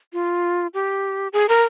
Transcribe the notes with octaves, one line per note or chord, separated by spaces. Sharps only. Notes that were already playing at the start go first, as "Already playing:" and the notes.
F4
G4
G#4
A#4